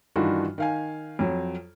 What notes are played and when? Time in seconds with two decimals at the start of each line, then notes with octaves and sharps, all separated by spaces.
0.16 G2 D#3 E3 D4 F4 F#4
0.58 D#3 F5 G#5
1.19 F2 F#3